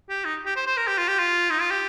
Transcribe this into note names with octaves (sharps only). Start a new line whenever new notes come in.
G4
D#4
G4
C5
C5
A#4
G4
F4
G4
F4
D#4
F4
G4